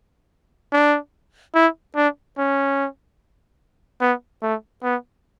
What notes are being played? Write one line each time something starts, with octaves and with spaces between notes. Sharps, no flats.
D4
E4
D4
C#4
B3
A3
B3